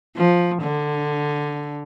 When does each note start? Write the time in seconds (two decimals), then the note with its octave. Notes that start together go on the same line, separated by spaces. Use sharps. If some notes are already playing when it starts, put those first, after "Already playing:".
0.16 F3
0.63 D3